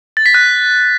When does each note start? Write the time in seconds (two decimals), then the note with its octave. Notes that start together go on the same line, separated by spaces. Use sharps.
0.17 A6
0.26 B6
0.34 F#6